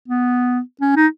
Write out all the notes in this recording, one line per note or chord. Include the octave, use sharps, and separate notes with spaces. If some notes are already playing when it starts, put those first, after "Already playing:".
B3
C#4
D#4